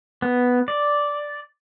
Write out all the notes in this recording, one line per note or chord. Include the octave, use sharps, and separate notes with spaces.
B3
D5